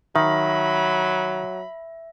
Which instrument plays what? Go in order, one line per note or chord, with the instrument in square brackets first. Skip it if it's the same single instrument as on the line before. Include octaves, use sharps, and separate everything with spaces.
[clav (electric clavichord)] D#3 [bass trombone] F#3 [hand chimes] E5 [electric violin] B5